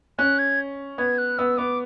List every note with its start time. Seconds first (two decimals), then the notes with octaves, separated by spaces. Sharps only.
0.19 C#4 F#6
0.39 G#6
0.98 B3 G#6
1.18 F#6
1.38 B3 E6
1.58 B3 D6